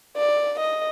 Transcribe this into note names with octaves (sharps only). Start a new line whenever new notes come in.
D5
D#5